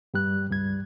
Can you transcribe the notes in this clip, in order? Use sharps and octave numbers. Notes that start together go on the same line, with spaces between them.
G2 G3 F#6
C#2 G2 G3 G#6